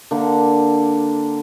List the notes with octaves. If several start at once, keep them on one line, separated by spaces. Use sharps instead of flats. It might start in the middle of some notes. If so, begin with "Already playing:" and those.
D3 A#3